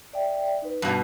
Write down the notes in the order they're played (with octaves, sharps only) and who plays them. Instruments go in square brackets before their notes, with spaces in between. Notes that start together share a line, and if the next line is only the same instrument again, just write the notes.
[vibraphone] D5 E5 G5
D#4 B4
[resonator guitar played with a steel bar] G2 B2